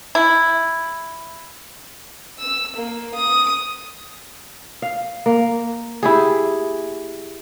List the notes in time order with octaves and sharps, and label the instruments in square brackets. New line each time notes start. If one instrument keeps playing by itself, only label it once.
[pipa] E4
[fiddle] E6
A#3
D#6
[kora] F5
A#3
E4 G4 G#4